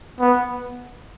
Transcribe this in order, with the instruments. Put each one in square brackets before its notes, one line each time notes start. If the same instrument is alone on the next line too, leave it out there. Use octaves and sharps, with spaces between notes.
[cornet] B3